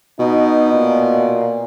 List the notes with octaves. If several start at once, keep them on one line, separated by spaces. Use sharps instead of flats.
B2 D#4
A#2